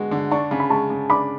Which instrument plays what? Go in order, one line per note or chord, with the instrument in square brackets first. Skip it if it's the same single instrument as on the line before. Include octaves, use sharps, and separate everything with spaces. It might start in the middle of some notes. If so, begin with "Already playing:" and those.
Already playing: [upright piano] D3 G#3 B3 F#4
D3
[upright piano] D4 [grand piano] A5 C#6
[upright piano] C#3
[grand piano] B5
[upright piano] G#3 [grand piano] A5 C#6
[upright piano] C#3
[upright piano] D4 [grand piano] B5 D6